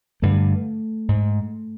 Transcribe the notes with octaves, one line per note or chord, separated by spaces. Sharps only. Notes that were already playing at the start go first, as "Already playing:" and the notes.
G2 D3 A3
G#2